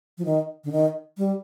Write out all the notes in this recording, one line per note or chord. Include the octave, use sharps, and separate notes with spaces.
F3
D#3
D3
D#3
G3